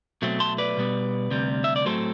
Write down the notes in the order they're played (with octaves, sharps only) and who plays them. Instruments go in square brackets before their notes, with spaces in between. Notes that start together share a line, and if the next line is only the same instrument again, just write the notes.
[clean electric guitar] B2 F#3 A3 C4
A5 C6
B4 D5
B2 G3 B3
D2 C3 G3
E5
D5
A2 F#3 A3 C4 A4 C5